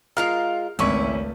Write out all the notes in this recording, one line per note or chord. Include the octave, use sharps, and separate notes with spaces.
G#3 F4 A#4 F5 F6
G#1 C#2 A3 C#4 E4 C#6